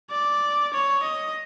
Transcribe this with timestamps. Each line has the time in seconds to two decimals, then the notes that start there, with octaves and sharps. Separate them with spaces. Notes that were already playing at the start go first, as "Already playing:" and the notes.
0.11 D5
0.73 C#5
1.03 D#5